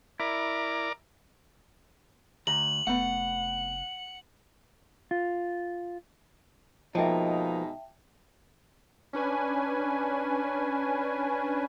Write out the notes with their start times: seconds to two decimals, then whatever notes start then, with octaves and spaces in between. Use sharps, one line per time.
0.20 E4 A#4 D5
2.47 D2 A#5 F#7
2.87 F1 A3 B3 F#5
5.11 F4
6.95 B2 F3 G#3 A#3 D#4 E5 G5 A5
9.13 C#4 D4 B4 G#5